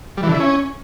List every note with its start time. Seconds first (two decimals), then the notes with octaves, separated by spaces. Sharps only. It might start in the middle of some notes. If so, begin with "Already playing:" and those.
0.17 G3
0.23 E3
0.29 D3
0.34 E4
0.40 C#4